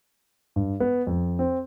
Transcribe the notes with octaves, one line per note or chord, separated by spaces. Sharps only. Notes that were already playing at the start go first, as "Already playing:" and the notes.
G2
B3
F2
C4